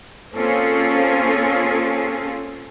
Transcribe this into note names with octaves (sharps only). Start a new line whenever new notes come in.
A#3 C4 C#4 F4 G#4 A4